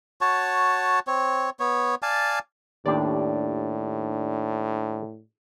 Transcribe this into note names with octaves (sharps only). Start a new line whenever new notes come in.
F#4 C#5 A5
C4 C#5
B3 C#5
D5 F5 G#5 A5
D#2 A2 D4 G4 D5